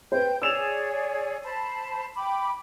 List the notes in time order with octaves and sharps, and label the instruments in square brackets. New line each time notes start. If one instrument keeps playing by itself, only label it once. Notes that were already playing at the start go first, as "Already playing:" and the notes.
[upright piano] B4 C5 [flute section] G5 G6
[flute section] G#4 C#5 D5 [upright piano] E6 E7 F7
[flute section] C5 A5 B5
G5 B5 D6